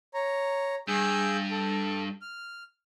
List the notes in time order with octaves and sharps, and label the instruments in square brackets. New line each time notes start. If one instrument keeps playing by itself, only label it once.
[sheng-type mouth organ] C#5 A#5
[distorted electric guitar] G2 [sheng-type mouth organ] G#4 E6 G6
[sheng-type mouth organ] A4
F6